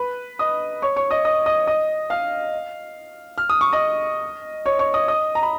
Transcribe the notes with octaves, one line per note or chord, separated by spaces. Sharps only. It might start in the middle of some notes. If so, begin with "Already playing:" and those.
Already playing: B4 B5
D#5 D#6
C#5 C#6
C#5 C#6
D#5 D#6
D#5 D#6
D#5 D#6
D#5 D#6
F5 F6
F6
D#6
C#6
D#5 D#6
C#5 C#6
C#5 C#6
D#5 D#6
D#5 D#6
A#5
B5